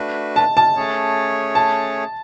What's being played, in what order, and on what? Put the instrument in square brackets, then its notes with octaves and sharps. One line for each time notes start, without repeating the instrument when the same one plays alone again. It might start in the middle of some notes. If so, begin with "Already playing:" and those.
Already playing: [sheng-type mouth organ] A3 D4 F#4 B4
[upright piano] A5
A5
[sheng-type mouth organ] A3 C#4 G#4 C#5
[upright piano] A5